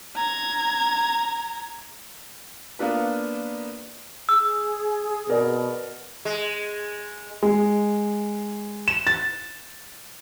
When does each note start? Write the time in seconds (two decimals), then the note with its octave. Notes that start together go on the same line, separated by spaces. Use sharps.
0.15 A#5 G#6
2.79 A#3 B3 D4 F4 B4
4.29 G#4 E6
5.29 B2 A#4 D5
6.25 G#3
7.42 G#3
8.88 E7
9.07 A6